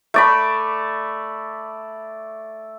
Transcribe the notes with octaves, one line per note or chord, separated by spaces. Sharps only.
A3 D5 B5